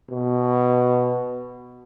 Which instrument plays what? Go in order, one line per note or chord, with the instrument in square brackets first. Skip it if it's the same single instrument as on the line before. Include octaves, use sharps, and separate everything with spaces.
[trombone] B2